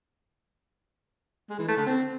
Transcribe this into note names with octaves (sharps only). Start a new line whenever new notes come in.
G#3
E3
A3
D3
C4